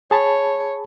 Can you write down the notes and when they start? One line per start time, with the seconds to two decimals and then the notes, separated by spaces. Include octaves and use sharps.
0.11 G#4 C#5 A5 B5